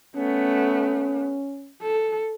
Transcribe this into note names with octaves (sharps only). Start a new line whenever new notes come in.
A3 B3 C#4
A4